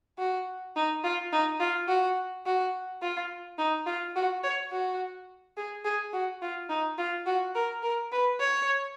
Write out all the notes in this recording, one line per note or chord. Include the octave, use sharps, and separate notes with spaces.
F#4
D#4
F4
D#4
F4
F#4
F#4
F4
D#4
F4
F#4
C#5
F#4
G#4
G#4
F#4
F4
D#4
F4
F#4
A#4
A#4
B4
C#5